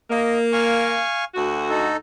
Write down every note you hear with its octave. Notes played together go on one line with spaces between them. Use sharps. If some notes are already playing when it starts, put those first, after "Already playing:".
A#3 D#5
F5 G#5 C#6
D2 F#4
D#4 A4